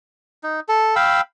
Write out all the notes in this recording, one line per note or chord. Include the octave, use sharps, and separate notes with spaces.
D#4
A4
F5 G5 B5 E6